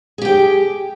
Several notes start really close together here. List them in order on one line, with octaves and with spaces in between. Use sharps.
G#4 G4 G5